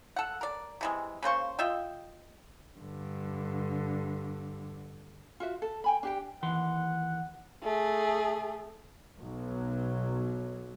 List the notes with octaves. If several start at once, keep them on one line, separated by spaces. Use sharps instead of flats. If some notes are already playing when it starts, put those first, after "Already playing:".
A4 F#5
A#4 D5
C3 E3 G#3
C#3 A#3 C5 C#6
F4 D#5 E5 G5
G2 D3
F4 F#4 E5
A4
G5 G#5 B5
D4 G4 G5
D#2 E3 F#5 C6
A3 G#4
B1 F#3